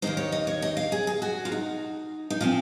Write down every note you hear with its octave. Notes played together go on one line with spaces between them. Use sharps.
D#2 D#3 A#3 D#4 C5
C#5
D#5
C#5
D#5
F5
G#4
G#4
F#4
F4
D#4
D#4
A#2 F3 C4 F4